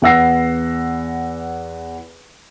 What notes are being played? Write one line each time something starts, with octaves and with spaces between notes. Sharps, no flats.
E2 B4 F#5 E6 A#6 C7